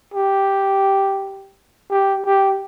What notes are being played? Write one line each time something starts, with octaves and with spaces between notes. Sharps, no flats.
G4
G4
G4